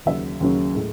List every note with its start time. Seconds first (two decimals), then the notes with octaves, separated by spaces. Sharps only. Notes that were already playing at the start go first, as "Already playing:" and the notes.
0.06 D#2 C#3 F#3 E5
0.40 D#2 C#3 F#3 C#4
0.74 A2 G#3